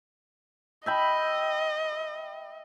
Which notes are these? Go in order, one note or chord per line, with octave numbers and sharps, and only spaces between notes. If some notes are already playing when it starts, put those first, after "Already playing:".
D#5 E5 G5 B5